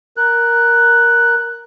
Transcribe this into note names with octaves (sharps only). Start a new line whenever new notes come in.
A#4 F#6